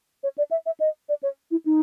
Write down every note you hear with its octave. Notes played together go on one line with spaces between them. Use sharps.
C#5
D5
E5
E5
D#5
D5
C#5
E4
D#4